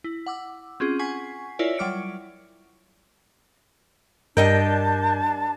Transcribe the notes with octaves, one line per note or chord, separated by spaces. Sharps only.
E4
F#5 D6 E6
C4 C#4 F4 G#4
F#5 G#5 C#6 G#6 B6 C7
E4 F4 A#4 C#5 D5 E5
F#3 G3 D6 F6 C#7 D7
G2 G3 D4 A#4 D#5 G5 A5 G6